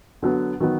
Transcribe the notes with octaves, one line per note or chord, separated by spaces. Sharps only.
D3 F#3 B3
D#3 F#3 B3